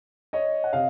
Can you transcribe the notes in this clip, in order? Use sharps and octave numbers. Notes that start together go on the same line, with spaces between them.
C#5 D#5
F#5
C3 D#5 F5